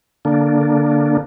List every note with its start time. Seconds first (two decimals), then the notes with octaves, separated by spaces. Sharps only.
0.25 D3 A#3 D4